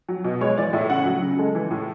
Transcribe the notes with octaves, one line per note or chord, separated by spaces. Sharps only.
F#3
B2
G#3 C#5
E3 D5
A2 E5
C#3 F#5
F#3
C#3
G#3 A4
E3
A2